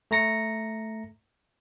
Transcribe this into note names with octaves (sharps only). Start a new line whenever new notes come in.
A3 A#5 A#6 C#7